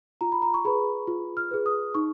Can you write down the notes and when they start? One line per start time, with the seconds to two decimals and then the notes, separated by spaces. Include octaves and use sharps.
0.21 F4 A#5
0.32 B5
0.42 A#5
0.54 C#6
0.65 G#4 B4 B5
1.07 F4
1.37 F6
1.51 G#4 B4
1.66 D#6
1.94 D#4 C#6